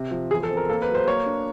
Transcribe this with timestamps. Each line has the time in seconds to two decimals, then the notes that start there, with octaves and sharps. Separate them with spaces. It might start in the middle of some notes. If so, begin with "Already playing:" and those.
Already playing: C3
0.11 F3
0.31 E2 G#4
0.43 A4
0.50 C4
0.57 A#4
0.69 A#3 A4
0.82 B4
0.88 F#3
0.95 C5
1.07 A#3 C#5
1.26 D4